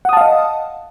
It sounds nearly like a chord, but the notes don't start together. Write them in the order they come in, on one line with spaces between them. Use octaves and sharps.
F#5 D#6 A5 F5 D#5